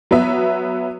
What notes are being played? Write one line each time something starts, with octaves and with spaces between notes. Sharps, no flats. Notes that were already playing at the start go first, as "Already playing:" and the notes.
F#3 B3 B4 E5